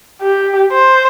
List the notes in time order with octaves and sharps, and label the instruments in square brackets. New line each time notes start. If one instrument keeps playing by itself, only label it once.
[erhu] G4
C5